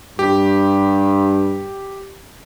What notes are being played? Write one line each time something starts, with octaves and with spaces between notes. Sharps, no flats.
G2 G4